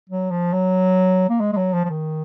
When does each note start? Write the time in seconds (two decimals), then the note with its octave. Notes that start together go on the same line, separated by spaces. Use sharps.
0.10 F#3
0.31 F3
0.53 F#3
1.29 A#3
1.41 G#3
1.53 G#3
1.57 F#3
1.74 F3
1.85 F3
1.90 D#3